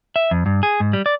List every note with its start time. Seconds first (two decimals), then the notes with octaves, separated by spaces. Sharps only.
0.16 E5
0.31 F2
0.46 G2
0.63 G#4
0.80 G#2
0.93 G3
1.06 D5